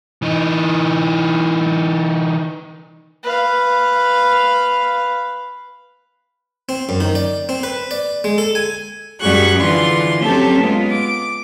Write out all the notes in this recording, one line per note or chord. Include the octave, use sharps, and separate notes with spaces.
E3 D#4
B4 F5
C4
F#2
D#3
D5
C4
B4
D5
G#3
A4
G#5
F#2 G3 F#4 G#4 C#6 F#6
D3 E3 F4 C6
F#3 C4 C#4 G4 A4 C#5
G#3 B3 F4
D6